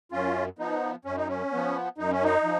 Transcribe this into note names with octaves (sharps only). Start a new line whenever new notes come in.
F#2 C#4 F4
F3 B3 D#4
F#2 C#4
D#4
C#4
F3 B3
F#2 D#4
C#4
D#4
F3